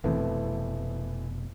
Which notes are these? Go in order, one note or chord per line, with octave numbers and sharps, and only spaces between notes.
F1 B2 E3 A3 C4